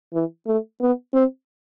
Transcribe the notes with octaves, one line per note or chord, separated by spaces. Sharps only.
E3
A3
B3
C4